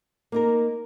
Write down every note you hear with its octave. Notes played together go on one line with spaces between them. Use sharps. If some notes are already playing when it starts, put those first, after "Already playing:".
A#3 D#4 A#4